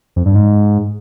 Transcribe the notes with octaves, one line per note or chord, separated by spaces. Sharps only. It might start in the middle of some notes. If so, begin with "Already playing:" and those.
F2
G2
G#2